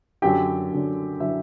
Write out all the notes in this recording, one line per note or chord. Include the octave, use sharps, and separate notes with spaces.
F#2 D3 F#3 G4 G5
F#2 D3 F#3
D3 F#3 E4 E5